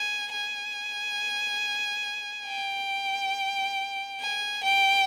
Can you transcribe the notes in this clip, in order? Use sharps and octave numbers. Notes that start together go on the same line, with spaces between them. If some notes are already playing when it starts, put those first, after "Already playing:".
Already playing: G#5
G#5
G5
G#5
G5